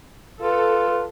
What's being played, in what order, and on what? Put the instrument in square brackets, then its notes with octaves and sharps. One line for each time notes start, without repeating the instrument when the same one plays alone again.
[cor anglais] F4 [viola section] A4 [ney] B4